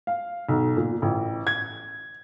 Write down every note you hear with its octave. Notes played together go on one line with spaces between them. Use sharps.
F5
B1
A#2
A1
G#6